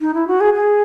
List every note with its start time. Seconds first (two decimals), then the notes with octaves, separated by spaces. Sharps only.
0.01 D#4
0.14 E4
0.28 F#4
0.41 G#4
0.54 G#4